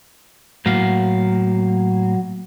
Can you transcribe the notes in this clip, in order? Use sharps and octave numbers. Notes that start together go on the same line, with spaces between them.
A2 F#3 A#3 F5